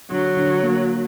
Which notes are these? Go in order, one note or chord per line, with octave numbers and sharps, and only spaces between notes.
D3 F#3
D3
A#3